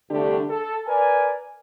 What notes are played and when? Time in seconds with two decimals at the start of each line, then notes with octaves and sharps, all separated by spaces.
0.10 C2 D3 G3 A3 D4 G4
0.50 A4
0.87 A#4 B4 D5 G#5